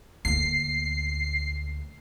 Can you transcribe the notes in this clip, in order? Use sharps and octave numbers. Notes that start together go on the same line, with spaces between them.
D2 A#3 C7